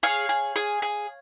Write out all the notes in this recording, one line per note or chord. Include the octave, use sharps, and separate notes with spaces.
G#4 C#5 F5
G#4
G#4
G#4